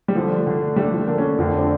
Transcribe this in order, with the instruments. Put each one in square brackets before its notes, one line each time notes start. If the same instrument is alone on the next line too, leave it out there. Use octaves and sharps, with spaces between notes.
[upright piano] G3
[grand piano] D3 A3 D4 [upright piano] F3
[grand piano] D3 A3 D4
[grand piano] D3 A3 D4 [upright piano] G3
[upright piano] F3
[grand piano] D3 A3 D4 [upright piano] A#3
[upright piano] C#4
[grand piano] F2 D3 F3 A3 [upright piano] F4
[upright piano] D4